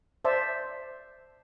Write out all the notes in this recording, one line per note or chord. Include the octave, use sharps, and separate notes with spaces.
C5 D5 E5 A5